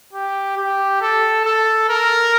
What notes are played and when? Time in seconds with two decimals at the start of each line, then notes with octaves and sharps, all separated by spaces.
0.13 G4
0.57 G4
1.01 A4
1.45 A4
1.89 A#4